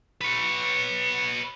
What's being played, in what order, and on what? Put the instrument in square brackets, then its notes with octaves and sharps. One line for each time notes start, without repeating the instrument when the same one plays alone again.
[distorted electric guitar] B4 C#5